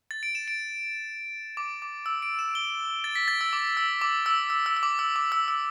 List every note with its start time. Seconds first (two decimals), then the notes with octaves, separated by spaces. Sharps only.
0.11 A6
0.23 D7
0.35 E7
0.48 D7
1.57 D6
1.82 D6
2.06 E6
2.22 D7
2.39 E7
2.55 G7
3.04 A6
3.15 B6
3.28 A6
3.41 E6
3.53 D6
3.77 E6
4.01 D6
4.26 E6
4.50 E6
4.66 E6
4.77 E6
4.83 D6
4.99 E6
5.16 D6
5.32 E6
5.48 E6